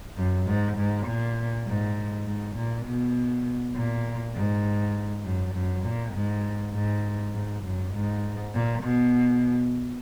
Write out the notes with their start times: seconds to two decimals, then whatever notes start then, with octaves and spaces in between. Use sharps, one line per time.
0.17 F#2
0.47 G#2
0.78 G#2
1.07 A#2
1.66 G#2
2.26 G#2
2.56 A#2
2.86 B2
3.75 A#2
4.35 G#2
5.25 F#2
5.55 F#2
5.85 A#2
6.14 G#2
6.74 G#2
7.35 G#2
7.64 F#2
7.94 G#2
8.54 A#2
8.83 B2